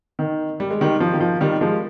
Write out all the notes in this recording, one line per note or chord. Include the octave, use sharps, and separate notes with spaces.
D#3
G3
G#3
D#3 G3
F3
D#3
F3
D#3 G3
F3 G#3